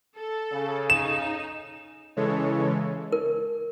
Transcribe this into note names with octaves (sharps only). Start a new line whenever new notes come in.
A4
C#3
D#4 E7
C#3 E3 G#3 A4 C#5
A#4